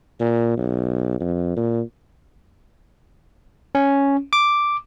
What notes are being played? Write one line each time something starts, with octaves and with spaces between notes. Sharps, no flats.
A#2
B1
F2
A#2
C#4
D6